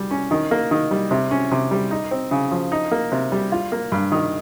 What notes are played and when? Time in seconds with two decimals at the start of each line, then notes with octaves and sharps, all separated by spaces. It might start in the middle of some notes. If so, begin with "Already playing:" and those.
Already playing: G3
0.11 C#4
0.31 D#3
0.51 A#3
0.71 D#3
0.91 G3
1.11 C3
1.31 C#4
1.51 C3
1.71 G3
1.91 D#4
2.11 C4
2.31 C#3
2.51 F3
2.72 D#4
2.91 A#3
3.12 C3
3.32 G3
3.52 F4
3.72 A#3
3.92 G2
4.12 D#3